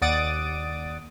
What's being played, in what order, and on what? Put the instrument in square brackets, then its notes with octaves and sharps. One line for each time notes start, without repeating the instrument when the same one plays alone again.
[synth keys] D#2 D5 F#5 D#6 A6 D7